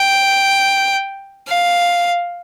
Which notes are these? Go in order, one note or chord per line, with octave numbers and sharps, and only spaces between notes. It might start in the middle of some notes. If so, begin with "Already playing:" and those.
Already playing: G5
F5